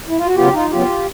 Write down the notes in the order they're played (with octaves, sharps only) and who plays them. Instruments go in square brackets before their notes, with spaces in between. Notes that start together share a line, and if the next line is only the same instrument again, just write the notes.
[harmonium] E4
F4
F#4
C#3 F#3 B3 F4 G4
D#4 F4
C#3 F#3 B3 F4 G4